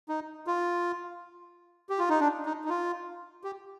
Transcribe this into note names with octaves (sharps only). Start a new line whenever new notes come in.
D#4
F4
G4
F4
D#4
D4
D#4
D#4
F4
G4